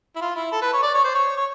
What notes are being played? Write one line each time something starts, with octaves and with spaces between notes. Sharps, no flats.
E4
F4
E4
A4
B4
C#5
D5
C#5
C5
C#5
C#5